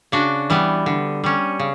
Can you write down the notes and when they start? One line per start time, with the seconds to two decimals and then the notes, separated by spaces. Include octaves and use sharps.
0.12 C#3 D4 F#4
0.50 E3 G3 B3
0.86 D3
1.24 G3 C#4
1.59 C#3